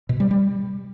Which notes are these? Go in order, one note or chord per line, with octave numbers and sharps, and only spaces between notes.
B2
G3
G3